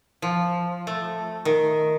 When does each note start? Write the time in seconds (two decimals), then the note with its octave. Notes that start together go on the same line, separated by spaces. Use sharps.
0.22 F3
0.87 A3
1.45 D#3